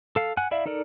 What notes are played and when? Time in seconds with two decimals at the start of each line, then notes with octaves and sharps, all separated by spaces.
0.16 A4 F5
0.37 F#5 G#5 F#6
0.51 E4 D5 E5 F5
0.66 D#4 A4 A#4 D5